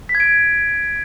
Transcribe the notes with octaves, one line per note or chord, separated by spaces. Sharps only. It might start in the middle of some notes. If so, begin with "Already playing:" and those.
B6
G#6
D7